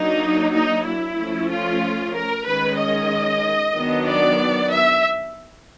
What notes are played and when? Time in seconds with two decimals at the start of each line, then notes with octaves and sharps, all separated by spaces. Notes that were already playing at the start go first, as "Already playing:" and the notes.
Already playing: F#3 A#3 D4 D#4
0.54 D#4
0.86 E4
1.19 F3 A3 C#4
1.51 F4
2.16 A#4
2.47 D#3 G#3 C#4 B4
2.80 D#5
3.75 D#3 F#3 B3 D4
4.07 D5
4.72 E5